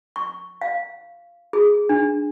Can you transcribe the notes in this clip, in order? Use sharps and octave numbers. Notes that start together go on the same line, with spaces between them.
C#6
F5
G#4
D4